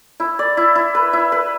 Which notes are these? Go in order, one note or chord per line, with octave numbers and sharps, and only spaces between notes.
E4
D5
E4
E4
B4
E4
B4